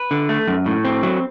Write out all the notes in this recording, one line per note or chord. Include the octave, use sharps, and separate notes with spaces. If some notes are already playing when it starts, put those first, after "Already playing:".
Already playing: B4
D3
A3
F#2
A2
C4
F#3